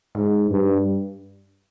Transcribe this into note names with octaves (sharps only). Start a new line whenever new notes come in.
G#2
G2